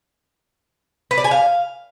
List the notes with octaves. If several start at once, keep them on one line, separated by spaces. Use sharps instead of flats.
B4
D5
G#5
F5